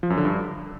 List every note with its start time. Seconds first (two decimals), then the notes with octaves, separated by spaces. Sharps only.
0.03 F3
0.10 F#2
0.18 D3
0.25 G2